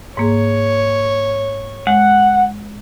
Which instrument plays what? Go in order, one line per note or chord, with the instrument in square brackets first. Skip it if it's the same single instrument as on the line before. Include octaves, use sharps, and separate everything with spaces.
[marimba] G#2 A#3 G#4 [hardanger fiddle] C#5
[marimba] G#3 [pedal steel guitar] F#5